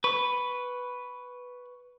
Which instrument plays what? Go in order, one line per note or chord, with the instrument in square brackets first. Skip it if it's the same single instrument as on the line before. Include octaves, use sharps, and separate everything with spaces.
[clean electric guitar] B4 [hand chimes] C#6